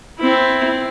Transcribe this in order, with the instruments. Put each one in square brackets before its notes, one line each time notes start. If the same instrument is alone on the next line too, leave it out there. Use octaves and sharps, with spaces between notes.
[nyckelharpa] C4 E4